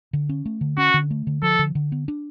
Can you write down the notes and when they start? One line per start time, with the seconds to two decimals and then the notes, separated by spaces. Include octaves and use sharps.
0.13 D3
0.29 C#4
0.46 A3
0.61 D3
0.78 C#4 F#4
0.94 D3
1.11 A3
1.27 D3
1.42 F3 A4
1.59 D3
1.75 D3
1.92 B3
2.08 D4